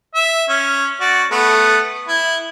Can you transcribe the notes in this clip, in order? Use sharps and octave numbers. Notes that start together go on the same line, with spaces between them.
E5
C#4
F#4 D5
A3 B3
E4